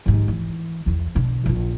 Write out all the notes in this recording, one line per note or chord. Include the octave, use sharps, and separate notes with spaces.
D#2 G#2
E3
E2 E3
B2 D3
A#1 F4